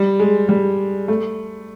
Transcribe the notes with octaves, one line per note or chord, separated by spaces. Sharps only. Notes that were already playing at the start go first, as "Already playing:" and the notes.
Already playing: G3
G#3
G3
A3